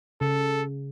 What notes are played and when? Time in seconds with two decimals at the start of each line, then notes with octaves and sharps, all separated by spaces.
0.21 C#3 A4